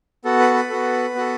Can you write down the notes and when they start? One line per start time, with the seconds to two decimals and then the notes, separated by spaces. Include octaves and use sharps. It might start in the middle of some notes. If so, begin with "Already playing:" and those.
0.25 B3 F#4 A4
0.39 B4
0.54 B4
0.70 B3 F#4 A4
1.15 B3 F#4 A4